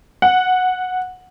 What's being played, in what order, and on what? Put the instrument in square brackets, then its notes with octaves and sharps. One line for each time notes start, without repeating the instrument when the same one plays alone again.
[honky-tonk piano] F#5